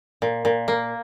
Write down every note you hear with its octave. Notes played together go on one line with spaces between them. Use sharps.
A#2
A#2
A#3